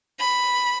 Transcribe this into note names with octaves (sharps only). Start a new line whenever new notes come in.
B5